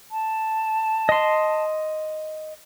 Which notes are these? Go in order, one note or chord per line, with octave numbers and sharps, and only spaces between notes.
A5
D#5 C6